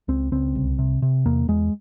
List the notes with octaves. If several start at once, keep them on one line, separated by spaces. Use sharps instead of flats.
C#2 C4
C#2 C4
C2
C3
C3
E2 A#3
E2 G#3